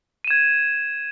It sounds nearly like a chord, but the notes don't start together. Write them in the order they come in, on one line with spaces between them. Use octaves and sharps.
D#7 E7 G#6